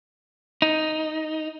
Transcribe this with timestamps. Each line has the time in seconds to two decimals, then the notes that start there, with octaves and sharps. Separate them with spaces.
0.62 D#4